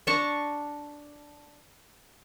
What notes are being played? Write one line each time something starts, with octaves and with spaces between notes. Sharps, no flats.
D4 A5 A#5 C#6